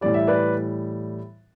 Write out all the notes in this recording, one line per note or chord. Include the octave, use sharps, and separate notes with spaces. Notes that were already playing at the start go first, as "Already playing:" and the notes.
A2 E3 G3 D5
E5
B4 D5